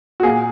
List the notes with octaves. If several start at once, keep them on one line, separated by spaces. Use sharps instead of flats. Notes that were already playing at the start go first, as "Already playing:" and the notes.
F#4
A#2 A#3 G#4